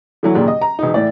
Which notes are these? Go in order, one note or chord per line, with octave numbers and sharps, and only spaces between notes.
D3 E3 F#3
D#2 A#2 C#3 D4
D#5
A#5
E1 D#4
A2 E3 D5